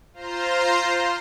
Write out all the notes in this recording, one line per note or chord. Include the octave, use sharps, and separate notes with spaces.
F4 C5 A#5 C6